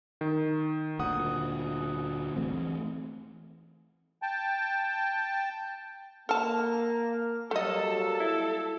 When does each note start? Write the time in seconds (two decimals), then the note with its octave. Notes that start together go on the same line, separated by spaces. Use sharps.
0.21 D#3
0.99 D2 A#2 F#5 D#6
2.36 E3 A3 C4
4.22 G5 A5
6.29 A#3 A4 A5 F6
7.51 F#3 G3 A3 A#3 A4 D#5
8.20 E4